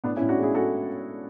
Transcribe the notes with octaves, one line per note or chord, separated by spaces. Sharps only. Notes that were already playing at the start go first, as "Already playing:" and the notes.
A2 B3 D4
C#4 E4
A2
D4 F#4
G#3
E4 G#4
G#3 F#4 A4